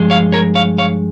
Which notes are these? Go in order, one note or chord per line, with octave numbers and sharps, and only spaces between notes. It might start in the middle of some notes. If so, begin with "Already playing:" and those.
Already playing: G2 F3 G#3
C#5 F5
A#4 C#5
C#5 F5
C#5 F5